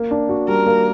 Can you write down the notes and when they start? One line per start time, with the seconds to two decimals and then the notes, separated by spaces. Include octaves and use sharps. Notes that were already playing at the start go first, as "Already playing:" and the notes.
Already playing: A#3
0.11 D4
0.29 F#4
0.48 G3 A#4
0.67 A#3